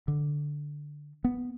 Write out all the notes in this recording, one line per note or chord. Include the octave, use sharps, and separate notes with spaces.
D3
B3